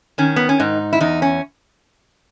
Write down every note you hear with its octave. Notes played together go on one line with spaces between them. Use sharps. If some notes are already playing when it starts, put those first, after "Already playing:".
D#3 C#4
B3
C#4
G#2 D#4
E4
E2 D#4
C#4